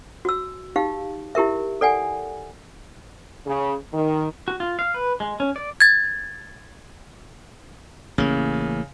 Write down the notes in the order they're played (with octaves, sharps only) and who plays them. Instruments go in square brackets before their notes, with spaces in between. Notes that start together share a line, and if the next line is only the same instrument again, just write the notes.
[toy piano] F#4 E6
D#4 G4 F5
E4 G4 A#4 E5
A4 D5 F#5 G#5
[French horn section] C#3
D#3
[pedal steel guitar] F#4
F4
F5
B4
G#3
C#4
D5
[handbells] G#6 A6
[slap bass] A1 A#3 [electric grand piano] C#3